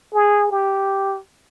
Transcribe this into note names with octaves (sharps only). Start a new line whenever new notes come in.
G#4
G4